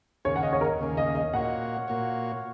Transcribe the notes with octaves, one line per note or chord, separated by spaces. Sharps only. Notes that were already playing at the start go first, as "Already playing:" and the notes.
D#2 C#3 A#3 C#4 C#5
F#5
D#5
C#5
A#4
D#2 C#3 A#3 C#4
D#5
D#5
A#2 A#3 F#4 C#5 F#5
A#2 A#3 F#4 C#5